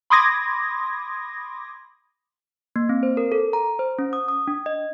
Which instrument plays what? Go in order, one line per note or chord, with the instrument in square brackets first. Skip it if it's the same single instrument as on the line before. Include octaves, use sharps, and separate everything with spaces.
[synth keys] B5 C6 D6 D#6 G#6 A#6
[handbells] A#3
C4
C5
A#4
A4
A#5
C5
C#4
D#6
D#6
D4
D#5